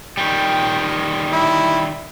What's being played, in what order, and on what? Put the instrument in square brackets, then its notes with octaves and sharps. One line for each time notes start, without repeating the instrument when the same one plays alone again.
[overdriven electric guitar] D#3 G3 [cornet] G5
[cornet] E4